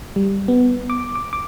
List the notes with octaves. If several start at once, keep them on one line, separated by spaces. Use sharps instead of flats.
G3
B3
D6
D6
D6